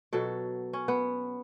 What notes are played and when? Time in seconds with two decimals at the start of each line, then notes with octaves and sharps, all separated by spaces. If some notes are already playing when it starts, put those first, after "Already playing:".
0.13 B2 F#3 A4
0.73 C#4
0.88 B3